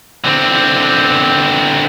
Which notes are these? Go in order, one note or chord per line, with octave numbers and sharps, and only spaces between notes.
D3 C4